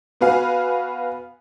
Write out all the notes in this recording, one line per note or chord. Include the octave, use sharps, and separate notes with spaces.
B3 F#4 B4 F5 G#5